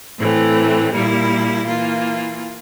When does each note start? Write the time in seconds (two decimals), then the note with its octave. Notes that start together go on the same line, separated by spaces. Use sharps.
0.18 A2 E3 A3 C4
0.92 A#2 G3 A#3 E4
1.66 E3 A#3 F4